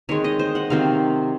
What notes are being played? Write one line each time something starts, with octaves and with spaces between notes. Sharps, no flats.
D#3 G#3 C4 C#5
D#5
C5
F#5
C3 D#3 F#3 C4 F5